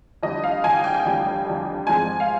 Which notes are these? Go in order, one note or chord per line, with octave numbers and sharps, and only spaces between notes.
F2 D3 G3 D#5
F5
F2 D3 G3 G#5
G5
G5
G5
F2 D3 G3
F2 D3 G3
G#2 F3 G#3 C4 G#5
F5